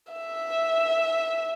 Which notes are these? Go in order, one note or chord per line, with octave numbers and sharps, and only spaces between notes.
E5